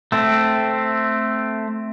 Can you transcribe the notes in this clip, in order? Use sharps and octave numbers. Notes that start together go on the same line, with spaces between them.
A3 C4